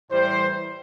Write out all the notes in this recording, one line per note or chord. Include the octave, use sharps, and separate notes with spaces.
A2 E3 G3 C5